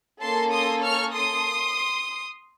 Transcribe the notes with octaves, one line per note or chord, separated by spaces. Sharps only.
A#3 C#4 A4 A5 C6
C6 D#6
C#6 F6
C6 D#6